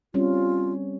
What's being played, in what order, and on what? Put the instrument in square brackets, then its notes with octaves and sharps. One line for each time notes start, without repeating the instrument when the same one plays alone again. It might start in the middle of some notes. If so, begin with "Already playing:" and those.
[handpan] G3 C4 C#4 [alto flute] F4